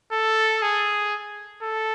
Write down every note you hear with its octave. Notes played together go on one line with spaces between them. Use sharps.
A4
G#4
A4